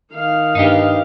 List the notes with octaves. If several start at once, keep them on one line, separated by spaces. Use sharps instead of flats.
D#3 F5
G2 D#4 G4